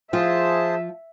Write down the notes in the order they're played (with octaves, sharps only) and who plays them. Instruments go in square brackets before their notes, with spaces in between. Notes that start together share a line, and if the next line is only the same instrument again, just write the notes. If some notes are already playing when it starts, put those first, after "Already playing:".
[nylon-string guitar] F3 F4 [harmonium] G#4 C5 A5 [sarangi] E5